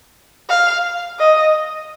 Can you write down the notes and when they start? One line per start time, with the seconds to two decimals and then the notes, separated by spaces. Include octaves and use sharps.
0.49 F5
1.19 D#5